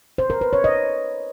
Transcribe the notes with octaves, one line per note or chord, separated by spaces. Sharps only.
C5
A#4
B4
C#5
D#5